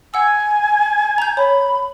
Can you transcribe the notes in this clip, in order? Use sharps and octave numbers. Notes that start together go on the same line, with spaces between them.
F#5 G#5 E6
A#5 G6
C#5 B5